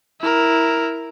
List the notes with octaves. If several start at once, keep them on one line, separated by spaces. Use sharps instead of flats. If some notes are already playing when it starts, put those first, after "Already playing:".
E4 A#4